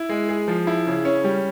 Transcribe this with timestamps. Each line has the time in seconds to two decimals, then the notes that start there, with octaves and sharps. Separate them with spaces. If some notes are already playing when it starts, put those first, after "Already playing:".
Already playing: E4
0.09 G#3
0.29 G#4
0.48 F3
0.67 E4
0.86 C#3
1.05 C#4
1.24 G3